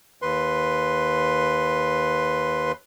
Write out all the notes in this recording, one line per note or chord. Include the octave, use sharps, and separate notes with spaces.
D#2 B4 C6